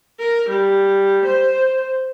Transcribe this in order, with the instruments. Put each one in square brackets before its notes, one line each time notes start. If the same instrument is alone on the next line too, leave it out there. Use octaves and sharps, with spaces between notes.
[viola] A#4
G3
C5